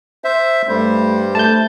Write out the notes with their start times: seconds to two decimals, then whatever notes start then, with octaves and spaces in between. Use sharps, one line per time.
0.24 C5 E5
0.69 G2 G3 A3 C5
1.35 A3 A5 G6